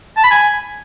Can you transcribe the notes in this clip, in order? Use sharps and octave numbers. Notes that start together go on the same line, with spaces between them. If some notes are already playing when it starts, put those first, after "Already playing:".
A5
B5
G#5